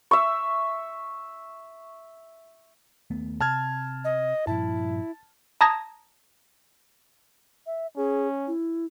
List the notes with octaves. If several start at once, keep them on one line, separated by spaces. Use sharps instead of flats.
E5 C#6
D#2 A3 B3
C3 A5 F6 G#6
D#5
G2 A#2 F3 E4 A5
A5 A#5 D#6 G#6 A#6
E5
C#4 G#4
E4